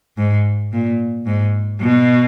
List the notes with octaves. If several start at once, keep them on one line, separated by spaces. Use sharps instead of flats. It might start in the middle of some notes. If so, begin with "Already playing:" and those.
G#2
A#2
G#2
B2